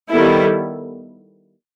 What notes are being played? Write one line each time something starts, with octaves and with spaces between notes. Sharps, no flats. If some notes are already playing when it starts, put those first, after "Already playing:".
D#3 G3 B3 E4 A4